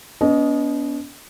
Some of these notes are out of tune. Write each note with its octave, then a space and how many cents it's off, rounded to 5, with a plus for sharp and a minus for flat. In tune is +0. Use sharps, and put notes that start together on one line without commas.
B3 +0 D4 -45 D#5 +0